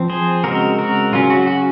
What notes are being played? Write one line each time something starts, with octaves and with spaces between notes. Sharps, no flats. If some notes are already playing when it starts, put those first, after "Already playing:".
Already playing: F3 C4
G#4 C5
C#3 G#3 C4 F#4 A#4
F#4 A#4
C#3 F#3 C#4 F4
F#4
F#4